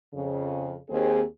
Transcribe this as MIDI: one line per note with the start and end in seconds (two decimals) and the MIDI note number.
0.14 0.74 41
0.14 0.74 49
0.90 1.21 39
0.90 1.21 60
0.90 1.21 68